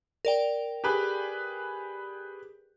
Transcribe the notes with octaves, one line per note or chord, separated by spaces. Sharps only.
A#4 D5 G5
G4 G#4 B4